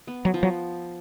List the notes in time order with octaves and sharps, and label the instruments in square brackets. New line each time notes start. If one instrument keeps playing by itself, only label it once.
[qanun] B3
[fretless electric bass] F#3
[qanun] F3
[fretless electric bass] F#3